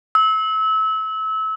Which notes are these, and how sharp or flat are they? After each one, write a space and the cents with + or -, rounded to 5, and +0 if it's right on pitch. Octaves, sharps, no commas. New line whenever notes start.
E6 -30